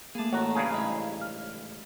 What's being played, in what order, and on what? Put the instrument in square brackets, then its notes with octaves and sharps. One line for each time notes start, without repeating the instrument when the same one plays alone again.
[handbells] A3 A#3 [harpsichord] G#4 A5
[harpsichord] A1 A3 [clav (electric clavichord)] F#4 [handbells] C#5 A#5
[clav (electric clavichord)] G2 C#3 G#4
[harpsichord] A1 G#2 E4
[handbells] F6